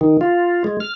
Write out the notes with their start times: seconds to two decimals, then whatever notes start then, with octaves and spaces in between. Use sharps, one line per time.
0.01 D#3
0.21 F4
0.64 G#3
0.80 F6